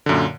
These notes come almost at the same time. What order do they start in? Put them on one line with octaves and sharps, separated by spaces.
D3 F#2 A#2